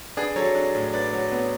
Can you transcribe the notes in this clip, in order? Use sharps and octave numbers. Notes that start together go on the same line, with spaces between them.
D4 G#4 B4
F#3 A4 C#5
D4
A2
D4 B4 D5
F#3
B3